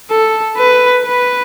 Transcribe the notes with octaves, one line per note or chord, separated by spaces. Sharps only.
A4
B4
B4